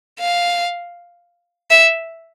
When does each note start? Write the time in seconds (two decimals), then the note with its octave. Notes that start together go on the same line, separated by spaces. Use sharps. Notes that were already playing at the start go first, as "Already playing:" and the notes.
0.19 F5
1.70 E5